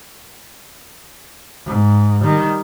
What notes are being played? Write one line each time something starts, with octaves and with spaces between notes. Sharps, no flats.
G#2
D#3 G3